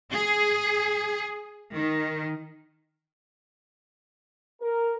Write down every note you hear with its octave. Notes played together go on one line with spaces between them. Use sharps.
G#4
D#3
A#4